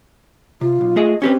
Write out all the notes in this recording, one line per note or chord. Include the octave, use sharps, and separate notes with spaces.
C3 F4
B1
A3 G#4 D#5
C4 C#4 G4 B4